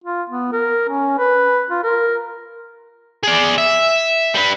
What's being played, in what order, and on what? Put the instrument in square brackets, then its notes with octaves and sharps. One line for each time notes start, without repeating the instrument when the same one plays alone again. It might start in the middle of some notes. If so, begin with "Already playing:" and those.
[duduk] F4
B3
A#4
C#4
B4
F4
A#4
[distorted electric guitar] G#4 D5
E5
G3 B4